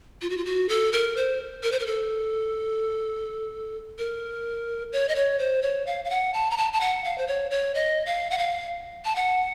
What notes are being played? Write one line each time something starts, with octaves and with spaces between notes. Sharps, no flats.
F4
F#4
F4
F#4
A4
A#4
C5
A#4
C5
A#4
A4
A#4
C#5
D#5
C#5
C5
C#5
F5
F5
F#5
A5
A#5
A5
A5
F#5
F5
C5
C#5
C#5
D#5
F5
F#5
F5
A5
F#5